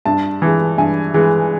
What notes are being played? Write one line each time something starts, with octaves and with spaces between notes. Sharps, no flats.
G2 A5
E3 G#3
G2 G#5
E3 G#3